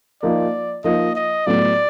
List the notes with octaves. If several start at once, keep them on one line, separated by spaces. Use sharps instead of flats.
F3 A#3 D#4 D5
F3 A#3 D#4 D#5
D#5
A2 F#3 B3 D5